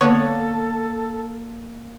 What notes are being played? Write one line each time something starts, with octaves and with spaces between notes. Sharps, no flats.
D3 A#3 B3 A4 C#5